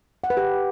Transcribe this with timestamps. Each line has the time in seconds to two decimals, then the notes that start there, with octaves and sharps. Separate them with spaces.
0.24 F#5
0.30 B4
0.37 G4